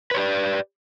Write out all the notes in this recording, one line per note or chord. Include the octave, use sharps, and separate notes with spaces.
G4 B4 C#5 D5